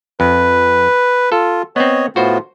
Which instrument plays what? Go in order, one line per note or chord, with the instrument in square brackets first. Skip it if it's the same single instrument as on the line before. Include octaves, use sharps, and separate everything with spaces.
[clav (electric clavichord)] F2 [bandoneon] B4
[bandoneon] F4 [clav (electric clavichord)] A4
[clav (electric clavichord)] B3 C4 [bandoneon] C#5 D#5
[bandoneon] A2 B3 F4 [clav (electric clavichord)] F#4 C5